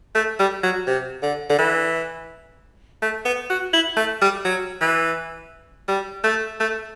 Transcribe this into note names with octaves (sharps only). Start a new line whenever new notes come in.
A3
G3
F#3
C3
D3
D3
E3
A3
B3
F#4
E4
A3
G3
F#3
E3
G3
A3
A3